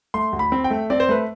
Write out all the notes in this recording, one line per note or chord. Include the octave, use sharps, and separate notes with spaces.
A3 C6
D2
B5
C4
G5
A3
C4 D5
C5
A3 B4